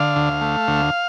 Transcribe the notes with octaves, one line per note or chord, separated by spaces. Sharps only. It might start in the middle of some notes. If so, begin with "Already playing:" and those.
Already playing: D3 F5
D2
A3
D2